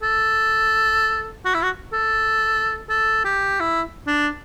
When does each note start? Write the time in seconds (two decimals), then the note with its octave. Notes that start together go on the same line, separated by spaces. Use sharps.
0.03 A4
1.45 F#4
1.55 E4
1.62 F#4
1.93 A4
2.89 A4
3.25 G4
3.60 E4
4.07 D4